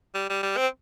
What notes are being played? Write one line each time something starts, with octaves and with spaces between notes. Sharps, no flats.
G3
G3
G3
C4